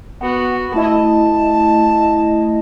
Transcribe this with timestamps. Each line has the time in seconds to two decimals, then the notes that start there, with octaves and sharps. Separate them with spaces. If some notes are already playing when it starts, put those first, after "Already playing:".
0.21 B3 F#4 F#5
0.74 A3 E4 D#5 A5